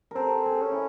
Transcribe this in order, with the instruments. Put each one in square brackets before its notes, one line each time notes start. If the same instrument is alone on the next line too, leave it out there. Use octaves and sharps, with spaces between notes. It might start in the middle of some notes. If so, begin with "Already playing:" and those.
[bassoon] C4 [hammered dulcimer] A4 A#4
[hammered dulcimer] G#4
[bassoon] C#4
[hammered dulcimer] E4